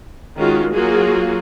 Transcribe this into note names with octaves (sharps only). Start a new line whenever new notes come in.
D#3 G#3 C#4 F4 F#4
F#3 A#3 F4 F#4 G#4